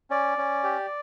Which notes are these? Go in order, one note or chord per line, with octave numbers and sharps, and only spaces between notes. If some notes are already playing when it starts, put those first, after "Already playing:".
C#4 D5
C#4
G4